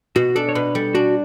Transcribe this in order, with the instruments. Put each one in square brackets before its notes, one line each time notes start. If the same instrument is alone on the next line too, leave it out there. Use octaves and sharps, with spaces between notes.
[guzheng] B2 [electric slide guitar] F#4
[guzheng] D4 [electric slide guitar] A4
[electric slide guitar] C#5
[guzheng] B2 [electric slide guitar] B4
[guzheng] G3 [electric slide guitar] A4
[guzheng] D4 [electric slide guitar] F#4